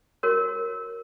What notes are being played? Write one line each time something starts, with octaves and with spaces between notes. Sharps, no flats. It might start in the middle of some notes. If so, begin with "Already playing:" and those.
F#4 A#4 C#5